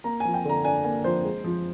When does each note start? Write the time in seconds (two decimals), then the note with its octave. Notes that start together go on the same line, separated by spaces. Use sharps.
0.04 A#3 A#5
0.20 F3 G#5
0.34 G5
0.45 D3 A#5
0.65 D4 G#5
0.84 A#3 G#5
1.04 F3 C5
1.24 G#3
1.44 F3